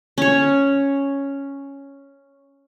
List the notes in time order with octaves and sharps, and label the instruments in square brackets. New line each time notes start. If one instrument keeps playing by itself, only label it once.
[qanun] C#4 C#5